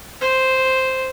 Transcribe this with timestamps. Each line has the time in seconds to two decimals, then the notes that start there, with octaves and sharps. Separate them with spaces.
0.21 C5